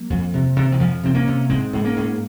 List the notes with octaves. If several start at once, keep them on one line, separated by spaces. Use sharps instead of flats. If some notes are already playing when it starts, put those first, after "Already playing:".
Already playing: F#3 A#3
F2
C3
C3
D#3
F2 F3
C3 C4
A#3 C#4
C3
G#2 G#3 C4
G#2
A#3 C#4
G#2